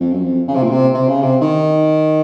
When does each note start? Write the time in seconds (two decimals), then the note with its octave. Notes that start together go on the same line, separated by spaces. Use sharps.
0.01 F2
0.12 F#2
0.24 F2
0.48 C#3
0.55 C3
0.63 A#2
0.72 C3
0.94 C3
1.09 C#3
1.22 C3
1.42 D#3